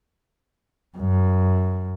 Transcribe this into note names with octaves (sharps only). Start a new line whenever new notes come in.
F#2